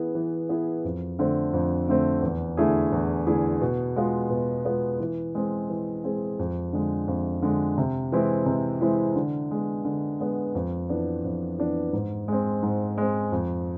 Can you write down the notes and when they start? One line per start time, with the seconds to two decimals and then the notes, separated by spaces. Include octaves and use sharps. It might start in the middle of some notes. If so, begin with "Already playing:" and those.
Already playing: E3 B3 E4 G#4
0.15 E3
0.49 B3 E4 G#4
0.85 F2
1.19 D3 A3 C4
1.53 F2
1.89 D3 A3 C4
2.22 E2
2.57 D3 A3 E4 G#4
2.92 E2
3.27 D3 A3 E4 G#4
3.61 B2
3.96 G#3 B3 F4
4.30 B2
4.65 G#3 B3 F4
5.00 E3
5.35 G#3 C4 G#4
5.70 E3
6.04 G#3 C4 G#4
6.39 F2
6.73 D3 G#3
7.08 F2
7.42 D3 G#3
7.78 C3
8.12 E3 G#3 C4 E4
8.46 C3
8.81 E3 G#3 C4 E4
9.16 D3
9.51 G#3 B3
9.85 D3
10.20 G#3 B3
10.55 F2
10.89 E3 B3 D4
11.24 F2
11.59 E3 B3 D4
11.93 G#2
12.28 G#3 C4
12.63 G#2
12.98 G#3 C4
13.32 F2